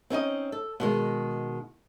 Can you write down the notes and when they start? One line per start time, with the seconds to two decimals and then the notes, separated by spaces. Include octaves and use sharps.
0.10 C4 C#4 D#4 D#5
0.52 A4
0.80 B2 D#3 G#3